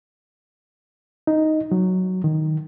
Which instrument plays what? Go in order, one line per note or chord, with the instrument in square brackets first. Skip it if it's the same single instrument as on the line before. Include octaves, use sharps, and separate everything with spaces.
[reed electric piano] D#4
F#3
D#3